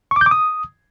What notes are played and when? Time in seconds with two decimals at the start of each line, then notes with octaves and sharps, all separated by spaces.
0.11 C#6
0.16 D6
0.21 G6
0.26 D6
0.31 D#6